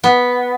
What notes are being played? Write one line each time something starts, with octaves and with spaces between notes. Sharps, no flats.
B3